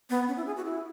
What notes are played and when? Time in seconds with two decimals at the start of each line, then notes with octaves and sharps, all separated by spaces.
0.10 B3
0.28 C#4
0.37 E4
0.46 G#4
0.56 F#4
0.65 E4